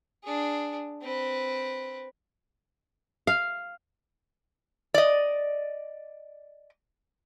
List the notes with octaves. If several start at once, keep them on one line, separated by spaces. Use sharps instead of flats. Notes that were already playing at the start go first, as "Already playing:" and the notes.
D4 G#4
C4 B4
F5
D5 D#5